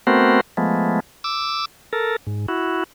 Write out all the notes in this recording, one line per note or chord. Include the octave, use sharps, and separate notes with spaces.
A3 B3 C4 F#4 A#4 C5
F3 G#3 A3 B3
D6 E6
A4 A#4
G#2
E4 F#4